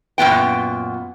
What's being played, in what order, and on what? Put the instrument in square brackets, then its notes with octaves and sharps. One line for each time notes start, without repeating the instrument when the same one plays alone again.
[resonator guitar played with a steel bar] F#2 A#2 B3 G5